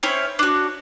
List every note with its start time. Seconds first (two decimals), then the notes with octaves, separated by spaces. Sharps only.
0.03 C4 C#4 E4 C#5
0.39 D4 F#4